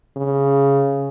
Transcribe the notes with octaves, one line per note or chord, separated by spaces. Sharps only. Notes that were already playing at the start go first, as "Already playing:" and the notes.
C#3